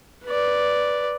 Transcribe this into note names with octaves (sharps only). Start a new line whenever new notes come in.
B4 D5